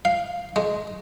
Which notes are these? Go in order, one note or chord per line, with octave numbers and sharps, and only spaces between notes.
F5
G#3